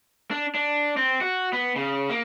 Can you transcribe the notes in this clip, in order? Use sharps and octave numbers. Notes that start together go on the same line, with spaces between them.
D4
D4
C4
F#4
B3
C#3
A#3